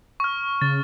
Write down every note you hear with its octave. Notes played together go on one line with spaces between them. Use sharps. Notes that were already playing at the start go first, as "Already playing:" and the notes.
C#6 F6
C#3 A6